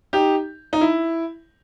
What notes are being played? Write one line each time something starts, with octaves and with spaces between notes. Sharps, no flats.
D#4 G4
D#4
E4